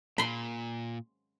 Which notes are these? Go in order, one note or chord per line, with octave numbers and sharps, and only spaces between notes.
A#2 B5 C6